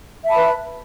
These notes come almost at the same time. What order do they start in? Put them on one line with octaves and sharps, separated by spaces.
E5 A5 B5 B4